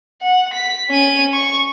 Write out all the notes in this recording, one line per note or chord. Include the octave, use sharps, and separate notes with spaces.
F#5
B6
C#4 D#7
C#6